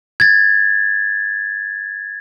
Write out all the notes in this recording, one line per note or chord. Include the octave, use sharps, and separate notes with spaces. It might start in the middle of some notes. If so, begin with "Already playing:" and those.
G#6 A6